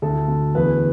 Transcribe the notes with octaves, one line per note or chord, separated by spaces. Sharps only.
D2 A4
D2
E2 B4